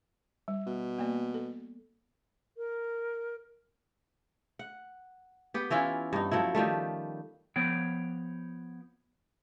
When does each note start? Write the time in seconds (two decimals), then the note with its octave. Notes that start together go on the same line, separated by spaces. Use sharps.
0.48 G3
0.67 B2
0.98 A#3 B3 D5
1.34 A4
2.57 A#4
4.59 F#5
5.54 B3 G4
5.70 E3 C#4 E4 F4
6.13 G2 D#4
6.31 F3 F#3 A3 E4
6.55 D#3 F3 G3 A3
7.56 F3 B3 C#5 G5